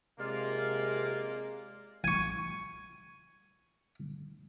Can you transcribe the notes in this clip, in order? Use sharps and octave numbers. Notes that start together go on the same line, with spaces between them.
C3 G#3 A#3 F4 D5
G#5 C#6